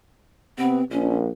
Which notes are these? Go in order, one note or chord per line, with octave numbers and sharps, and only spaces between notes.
C3 B3 C4
A#1 C#4